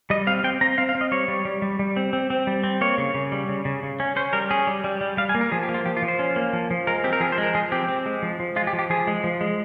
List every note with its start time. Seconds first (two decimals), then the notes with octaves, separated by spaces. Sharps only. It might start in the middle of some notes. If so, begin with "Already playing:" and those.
0.10 G3 D#5
0.27 C4 F5
0.44 C4 G5
0.61 C4 A#5
0.78 C4 F5
0.89 F5
0.95 C4
1.01 D#5
1.12 G3 C#5
1.28 G3
1.45 G3
1.62 G3
1.79 G3
1.97 C4
2.13 C4
2.30 C4
2.47 G3
2.63 C4
2.81 A#3 C#5
2.98 C#3
3.15 C#3
3.32 G3
3.49 C#3
3.65 C#3
3.83 C#3
4.00 C#4
4.16 C#4 C5
4.33 G3 A#4
4.51 C#4 G#4
4.67 G3
4.84 G3
5.01 G3
5.17 G3 F5
5.29 G#5
5.35 A#3
5.41 A#4
5.52 F3 G#4
5.63 G4
5.69 A#3
5.74 F4
5.85 F3 G4
5.97 F4
6.03 F3
6.08 C5
6.19 C#4
6.36 A#3
6.53 F3
6.71 F3
6.87 G#3 A#4
7.04 C4 G4
7.13 A#4
7.20 F3 G#4
7.32 C5
7.38 G#3
7.43 A#4
7.55 F3 G#4
7.72 C4 G4
7.88 C4
8.06 G#3
8.23 F3
8.40 F3
8.56 G#3 F4
8.67 G4
8.73 F3
8.79 G4
8.90 F3 G#4
9.07 G#3
9.24 F3
9.41 G#3